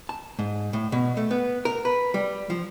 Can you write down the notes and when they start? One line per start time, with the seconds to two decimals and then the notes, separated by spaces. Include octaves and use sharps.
0.09 A5
0.39 G#2
0.73 A2
0.92 B2
1.17 A3
1.31 B3
1.65 A#4
1.85 B4
2.14 G3
2.50 F3